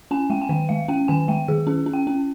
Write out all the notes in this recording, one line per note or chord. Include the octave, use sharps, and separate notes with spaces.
C#4 G#5
G#3 G5
G#5
D#3 G5
G#3 F5
C#4 G5
D#3 G#5
G#3 G5
D#3 G#4
C#4 G#4
C#4
G5
C#4